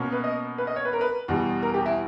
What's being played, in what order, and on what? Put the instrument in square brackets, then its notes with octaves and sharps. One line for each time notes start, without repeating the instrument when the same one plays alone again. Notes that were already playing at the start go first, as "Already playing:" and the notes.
Already playing: [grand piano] B2 A#3 C#4
B4
D#5
B4
D#5
C#5
B4
A#4
B4
E2 B2 G3
A#4
G4
E4